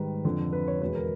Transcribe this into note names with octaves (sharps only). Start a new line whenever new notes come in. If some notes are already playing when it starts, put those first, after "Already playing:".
Already playing: G#2 D#3 G3 B4
F2 D3 F3
B4
C#5
E2 B2 G#3 B4
A#4